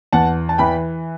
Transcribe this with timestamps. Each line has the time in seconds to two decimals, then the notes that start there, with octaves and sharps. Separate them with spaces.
0.13 E2 F#5 A5
0.49 A5
0.58 E3 G5 B5